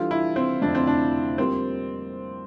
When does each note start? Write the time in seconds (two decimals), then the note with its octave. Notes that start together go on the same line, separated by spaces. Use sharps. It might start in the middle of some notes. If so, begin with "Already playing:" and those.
Already playing: E3 G3 D4 F4 A4
0.11 E4
0.36 C4
0.61 F2 D3 F3 A3 D4
0.75 C4
0.87 D4
1.38 G3 A#3 C4 F4 C5